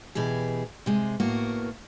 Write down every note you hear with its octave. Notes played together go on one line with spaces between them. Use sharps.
B2 E3 G4 G#4
C3 G#3
A2 A#3 B3 F#4